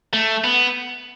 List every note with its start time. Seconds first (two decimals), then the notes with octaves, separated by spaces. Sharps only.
0.13 A3
0.44 B3